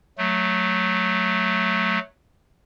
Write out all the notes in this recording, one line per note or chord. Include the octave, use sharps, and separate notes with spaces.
F#3 A3